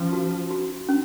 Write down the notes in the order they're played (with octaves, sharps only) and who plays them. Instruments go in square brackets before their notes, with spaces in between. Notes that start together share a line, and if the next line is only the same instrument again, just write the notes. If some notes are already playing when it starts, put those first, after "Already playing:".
Already playing: [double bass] F3 [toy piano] C#4
[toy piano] F#4
F#4
C#4